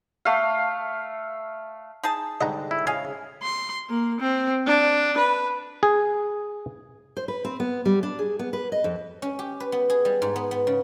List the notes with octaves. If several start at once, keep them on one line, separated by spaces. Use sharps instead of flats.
A3 F5
D#4 G#4 A5
G#2 D3 G3 D#5 F#5 A#5
E4
C#3 D#5 F5 G#5
C6
A#3
C4
D4
B4
G#4
C5
B4
C4
B3
G3
D4
G#4
B3
B4
D#5
F2
C#4
G4
B4
B3
G#4
G3
G#2
B3
B3
C#3